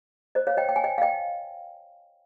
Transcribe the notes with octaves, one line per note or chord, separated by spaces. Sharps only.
C5 D#5
C#5 F5
D#5 G5
G5
G#5
D#5 G5
F5
D#5 G5